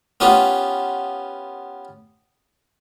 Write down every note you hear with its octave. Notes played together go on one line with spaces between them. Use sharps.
B3 C#4 F4 G4